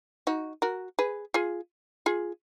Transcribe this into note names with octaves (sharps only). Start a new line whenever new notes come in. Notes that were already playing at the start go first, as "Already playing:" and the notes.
D#4 F#4
F#4 A#4
G#4 B4
F4 G#4
F4 G#4